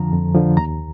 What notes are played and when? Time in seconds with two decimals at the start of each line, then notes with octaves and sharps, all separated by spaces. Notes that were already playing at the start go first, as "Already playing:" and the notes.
Already playing: F2 D3 F3 A#5
0.13 F2
0.35 D3 F3
0.57 D#2 A#5